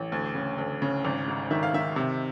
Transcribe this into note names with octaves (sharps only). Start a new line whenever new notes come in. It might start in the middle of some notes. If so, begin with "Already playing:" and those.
Already playing: A1
D2
C#3
D2
C#3
G#1
G#2
D#3 E5
F5
D#3 E5
C3